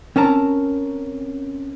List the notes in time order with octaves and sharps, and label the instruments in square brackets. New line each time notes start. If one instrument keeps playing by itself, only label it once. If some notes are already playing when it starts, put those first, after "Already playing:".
[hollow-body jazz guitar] C4 C#4 A#4 A5 A#5